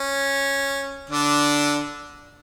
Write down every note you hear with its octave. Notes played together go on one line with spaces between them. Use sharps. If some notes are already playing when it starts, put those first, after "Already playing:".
Already playing: C#4
D3 D4